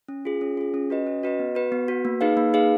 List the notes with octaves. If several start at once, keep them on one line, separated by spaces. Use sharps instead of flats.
C#4
F4 G#4
C#4
F4 G#4
C#4
F#4 B4 D#5
C#4
F#4 B4 D#5
B3
F#4 B4
B3
F#4 B4
A#3
D#4 G#4 B4 F5
A#3
D#4 G#4 B4 F5